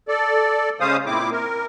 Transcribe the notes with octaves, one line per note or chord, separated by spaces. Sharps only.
A4 D5
C#3 G#3 C#4 C5 F5 D#6
A#2 C4 E4 D6
A#4